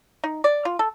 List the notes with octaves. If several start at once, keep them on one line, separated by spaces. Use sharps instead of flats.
D#4
D5
F4
A4